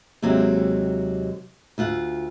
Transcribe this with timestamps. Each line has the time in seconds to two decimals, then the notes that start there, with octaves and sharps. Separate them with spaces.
0.22 D#2 C3 F#3 G#3 G4
1.78 D2 F4 F#5